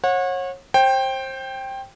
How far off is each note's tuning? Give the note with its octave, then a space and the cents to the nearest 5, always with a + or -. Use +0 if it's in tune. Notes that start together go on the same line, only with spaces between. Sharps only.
C#5 -30 F#5 -30
C5 +30 G5 +0